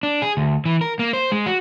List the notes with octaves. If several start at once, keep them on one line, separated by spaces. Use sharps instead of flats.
D4
G#4
D2
E3
A#4
A#3
C5
G#3
F#4